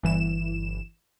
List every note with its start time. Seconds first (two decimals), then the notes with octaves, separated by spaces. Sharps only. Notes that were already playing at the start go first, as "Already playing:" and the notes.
0.03 G1 E3 E7